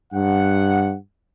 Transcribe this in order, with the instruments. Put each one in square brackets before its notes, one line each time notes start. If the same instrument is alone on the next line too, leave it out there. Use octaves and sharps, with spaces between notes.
[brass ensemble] G2 F#5